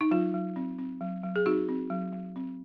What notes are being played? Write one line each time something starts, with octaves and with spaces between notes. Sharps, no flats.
D#4
F#3 F4
F#3
C4
C4
F#3
F#3
G#4
C4 D#4 F#4
C4
F#3
F#3
C4